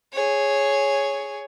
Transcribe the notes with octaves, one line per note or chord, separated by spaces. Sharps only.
G#4 C#5